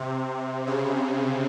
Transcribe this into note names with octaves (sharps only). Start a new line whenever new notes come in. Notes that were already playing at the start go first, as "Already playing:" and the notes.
Already playing: C3
C#3